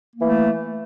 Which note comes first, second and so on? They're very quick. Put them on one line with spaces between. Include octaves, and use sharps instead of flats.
A#3 E3 A3